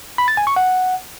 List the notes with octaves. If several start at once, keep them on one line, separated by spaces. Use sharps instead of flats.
B5
A6
G#5
C#6
F#5